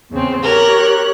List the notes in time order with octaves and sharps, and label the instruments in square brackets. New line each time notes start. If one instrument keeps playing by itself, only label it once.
[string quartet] E2 C#3 C4
[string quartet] G4 C#5 F#6 [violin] A#4